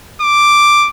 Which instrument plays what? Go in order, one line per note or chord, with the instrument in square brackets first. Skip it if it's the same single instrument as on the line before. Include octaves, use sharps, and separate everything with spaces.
[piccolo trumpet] D6